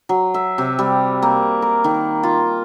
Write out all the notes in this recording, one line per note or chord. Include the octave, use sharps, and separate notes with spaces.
F#3
E5
C3
G3
A#3
A#4
D#3
F4